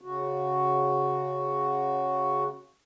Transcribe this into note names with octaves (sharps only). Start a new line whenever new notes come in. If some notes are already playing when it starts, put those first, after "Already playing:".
C#3 F#4